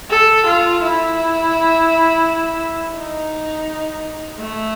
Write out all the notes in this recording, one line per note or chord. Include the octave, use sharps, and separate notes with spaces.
A4
F4
E4
D#4
A3